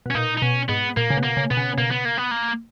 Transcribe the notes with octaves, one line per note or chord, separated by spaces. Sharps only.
B2
C#4
A#2 D#4
D#4
B2 C#4
G#2 B3
A#2 A#3
C#3
B2
A#3
C#3
B2 B3
C#3
C#3
B2 A#3
B3
A#3
B3
A#3